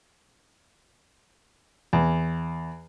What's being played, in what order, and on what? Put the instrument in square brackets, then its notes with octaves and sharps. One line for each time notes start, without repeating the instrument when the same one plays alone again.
[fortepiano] E2